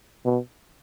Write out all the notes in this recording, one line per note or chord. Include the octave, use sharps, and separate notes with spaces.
B2